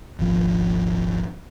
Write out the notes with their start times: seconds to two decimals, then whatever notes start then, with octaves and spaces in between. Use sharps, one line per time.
0.19 D#1 G#1 F3